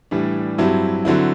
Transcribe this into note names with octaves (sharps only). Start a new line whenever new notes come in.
A2 E3 G3 D4
G2 F#3 C4 E4
D3 F#3 C4 E4